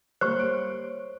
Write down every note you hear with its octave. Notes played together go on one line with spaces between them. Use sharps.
G3 A#3 C5 C#5 C#6 F6 F#6
D7